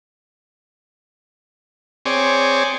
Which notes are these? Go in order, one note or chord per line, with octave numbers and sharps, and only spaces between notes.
C4 G#4 C#5 D5